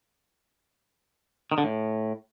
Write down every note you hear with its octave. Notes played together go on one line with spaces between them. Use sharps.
D#3
D3
A2